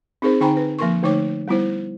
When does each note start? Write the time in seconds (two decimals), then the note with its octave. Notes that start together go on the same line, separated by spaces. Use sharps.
0.22 C4 D#4 G#4 A#4 C5
0.41 D3 D#4 G5 G#5 A#5 B5
0.57 B4
0.79 F3 A#3 A#4 C6 C#6
1.03 D3 A3 D#4 C#5 D6
1.48 G3 B3 E4 C5